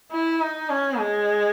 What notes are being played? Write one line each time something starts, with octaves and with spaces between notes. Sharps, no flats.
E4
D#4
C#4
G#3